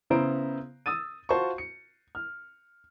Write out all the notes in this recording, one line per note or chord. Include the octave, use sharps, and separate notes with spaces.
C#3 B3 E4 C5 A#5 D7
D#6 E6 A6 D#7
F4 F#4 C5 A5 C#6
C#7
F6